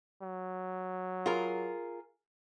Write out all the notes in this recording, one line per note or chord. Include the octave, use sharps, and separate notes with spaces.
F#3
F4 G#4 A#4